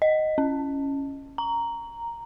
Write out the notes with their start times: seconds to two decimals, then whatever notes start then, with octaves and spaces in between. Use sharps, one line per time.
0.02 D#5
0.38 C#4
1.38 A#5